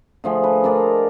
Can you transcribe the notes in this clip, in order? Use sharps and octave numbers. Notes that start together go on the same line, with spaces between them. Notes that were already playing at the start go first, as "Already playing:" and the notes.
D3 F3 A3 G#4
B4
D4 A#4 D5 D#5